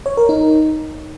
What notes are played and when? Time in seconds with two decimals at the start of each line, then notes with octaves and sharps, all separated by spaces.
0.06 C#5
0.17 A#4
0.29 D#4